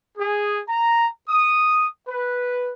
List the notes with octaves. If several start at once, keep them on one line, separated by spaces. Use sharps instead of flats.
G#4
A#5
D#6
B4